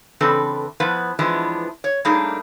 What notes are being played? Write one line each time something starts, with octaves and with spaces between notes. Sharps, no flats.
C#3 E3 C4 D4 A4 B4
F3 B3 E4 B4
E3 F3 G#3 B3 D4 E4
C#5
G3 A3 A#3 D4 D#4 G#4